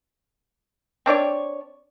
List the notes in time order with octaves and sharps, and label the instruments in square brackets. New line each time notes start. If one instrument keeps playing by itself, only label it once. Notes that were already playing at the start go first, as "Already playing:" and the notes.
[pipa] C4 D4 C#5 D5